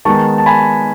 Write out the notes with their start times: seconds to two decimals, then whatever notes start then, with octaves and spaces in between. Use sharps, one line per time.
0.05 D#3 G#3 B3 D#4 A5 C#6
0.38 A5
0.46 G#5 B5